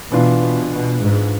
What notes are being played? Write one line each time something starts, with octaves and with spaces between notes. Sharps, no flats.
B2 E3 B3 D4 F4
B2
B2
G#2